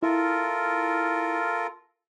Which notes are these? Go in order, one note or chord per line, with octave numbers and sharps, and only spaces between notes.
E4 F4 A4 A#4